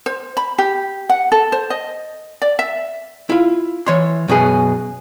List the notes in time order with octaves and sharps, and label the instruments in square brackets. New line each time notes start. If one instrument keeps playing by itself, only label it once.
[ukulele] C5
B5
G4
F#5
A4
C5
D#5
D5
E5
[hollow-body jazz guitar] E4 F4
E3 C#5 C6
F#2 B2 B3 G#4